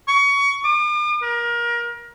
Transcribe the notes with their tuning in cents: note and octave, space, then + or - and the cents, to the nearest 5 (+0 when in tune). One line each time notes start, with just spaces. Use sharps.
C#6 +25
D6 +45
A#4 +25